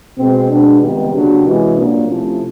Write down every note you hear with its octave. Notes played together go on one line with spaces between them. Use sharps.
B2 G#3 C4
B2 G#3 B3 D4
C#2 C3 D#3 G3 B3
C#3 F#3 A#3 D4 G4
C3 E3 G#3 C#4 F#4
C2 A#2 F#3 A#3 D4
C3 F3 A3 C#4 E4